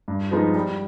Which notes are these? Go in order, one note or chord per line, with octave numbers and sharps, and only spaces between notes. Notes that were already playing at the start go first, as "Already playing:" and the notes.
G2
F3 G#3 B3 D#4
G3